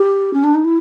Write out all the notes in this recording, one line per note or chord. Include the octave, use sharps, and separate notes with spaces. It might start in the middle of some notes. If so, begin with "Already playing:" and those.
Already playing: G4
C#4
D4
D#4
E4